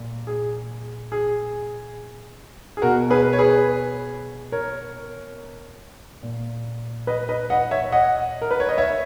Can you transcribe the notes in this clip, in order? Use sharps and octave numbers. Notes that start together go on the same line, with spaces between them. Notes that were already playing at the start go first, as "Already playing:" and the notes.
Already playing: A#2
G#4
G#4
G#4
B2 F#4 A#4
G#4 B4
C#5
G#4 B4
A#4 C#5
A#2
B4 D#5
B4 D#5
D#5 F#5
C#5 E5
D#5 F#5
A#4
B4
C#5
D#5
C#5 E5